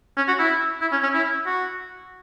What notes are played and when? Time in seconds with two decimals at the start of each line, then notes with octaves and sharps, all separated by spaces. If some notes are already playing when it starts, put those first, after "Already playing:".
0.17 C#4
0.28 F#4
0.39 E4
0.81 E4
0.92 C#4
1.03 C#4
1.13 E4
1.46 F#4